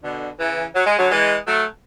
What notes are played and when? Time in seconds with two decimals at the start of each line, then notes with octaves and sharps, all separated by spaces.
0.04 B2 D3
0.40 C#3 E3
0.76 F#3
0.87 G#3
0.99 D3 F#3
1.11 E3 G#3
1.47 F#3 A3